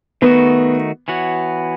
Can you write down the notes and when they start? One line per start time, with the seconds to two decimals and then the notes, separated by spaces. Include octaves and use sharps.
0.22 D#3 A3 B3 D#4 F#4
1.08 E3 B3 F#4 C#5